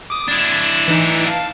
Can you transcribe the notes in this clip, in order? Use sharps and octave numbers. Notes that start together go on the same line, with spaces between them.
D6 D#6
D4 E4 G#6 A6
E3 D#4
F5 A5